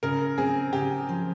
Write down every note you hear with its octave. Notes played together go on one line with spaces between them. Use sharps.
C#3 A#4
C4 G#4
C#3 G4
F3